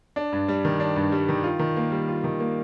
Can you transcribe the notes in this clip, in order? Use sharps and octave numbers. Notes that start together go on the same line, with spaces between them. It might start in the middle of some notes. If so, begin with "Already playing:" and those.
D4
G2
G3
D#3
D4
G2
G3
D#3
F4
D#3
A#3
G3
F4
D#3
A#3